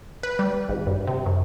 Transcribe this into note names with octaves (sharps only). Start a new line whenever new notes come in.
B4
G3
G#1
G2
C3
F#2